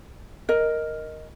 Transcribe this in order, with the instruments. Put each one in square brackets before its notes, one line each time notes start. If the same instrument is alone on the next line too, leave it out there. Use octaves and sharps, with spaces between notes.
[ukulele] A#4 D#5